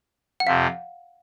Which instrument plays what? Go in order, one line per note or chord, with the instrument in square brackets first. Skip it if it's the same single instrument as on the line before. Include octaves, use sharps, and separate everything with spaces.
[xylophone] F#5
[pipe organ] F2 C3 F3 [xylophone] F5